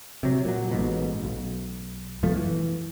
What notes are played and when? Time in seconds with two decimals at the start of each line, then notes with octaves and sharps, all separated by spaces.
0.23 C3 F#3
0.45 A#2 F#3
0.71 A1 G#2 B2
1.24 B1
2.23 F#2 B2 F3 A3
2.35 E3